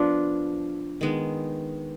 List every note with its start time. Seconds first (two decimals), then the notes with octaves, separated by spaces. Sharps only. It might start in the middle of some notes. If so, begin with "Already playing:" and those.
Already playing: F3 B3 D4 F4
1.01 D#3 G#3 B3